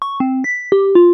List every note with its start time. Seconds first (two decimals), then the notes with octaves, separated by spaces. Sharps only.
0.02 C#6
0.20 C4
0.44 B6
0.72 G4
0.95 F4